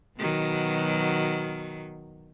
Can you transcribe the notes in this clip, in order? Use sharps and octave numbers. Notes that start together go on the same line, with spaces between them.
B2 D#3 F#3